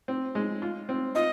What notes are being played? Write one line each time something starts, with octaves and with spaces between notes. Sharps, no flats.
C4
G#3
F4
C4
F4 D#5